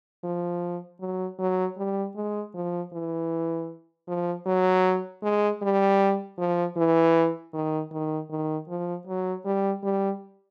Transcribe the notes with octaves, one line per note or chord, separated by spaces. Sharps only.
F3
F#3
F#3
G3
G#3
F3
E3
F3
F#3
G#3
G3
F3
E3
D#3
D#3
D#3
F3
F#3
G3
G3